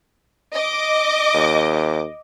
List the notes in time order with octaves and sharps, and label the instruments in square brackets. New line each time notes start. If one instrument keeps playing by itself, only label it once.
[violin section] D#5 D6
[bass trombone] D#2